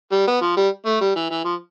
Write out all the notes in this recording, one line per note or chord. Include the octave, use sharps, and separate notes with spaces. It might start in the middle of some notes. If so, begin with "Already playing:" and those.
G3
B3
F3
G3
A3
G3
E3
E3
F3